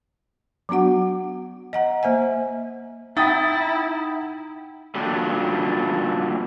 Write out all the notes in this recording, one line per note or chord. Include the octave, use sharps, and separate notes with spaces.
F#3 B3 D4 F#4 F#5
D#5 F#5 A#5
A#3 C5 E5 G#5
D#4 E4 F#5 G5 A#5 D#6 A6
A#2 D3 F#3 G3